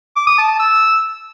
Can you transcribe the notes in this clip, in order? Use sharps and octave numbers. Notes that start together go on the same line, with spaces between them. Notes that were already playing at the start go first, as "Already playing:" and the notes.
D6
D#6
A5
A5
E6